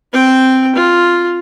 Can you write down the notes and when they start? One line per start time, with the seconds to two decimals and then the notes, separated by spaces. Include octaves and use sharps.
0.13 C4 G5
0.76 F4